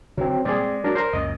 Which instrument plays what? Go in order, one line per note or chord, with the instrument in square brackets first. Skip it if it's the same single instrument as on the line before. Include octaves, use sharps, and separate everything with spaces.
[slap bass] D3 [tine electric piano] F#3 C4
[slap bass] A#2 G3 G#3 [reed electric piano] C4 G#4 [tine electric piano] D5
[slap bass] G#3
[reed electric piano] F#3 D4 A#4
A#4 C5
[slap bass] C#2 F#2 A#2 [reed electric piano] D#5